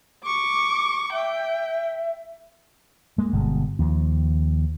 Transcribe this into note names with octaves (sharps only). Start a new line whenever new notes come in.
C#6 D6
E5 G5
G#3 A#3
G1 B2 G#3
D#2 F3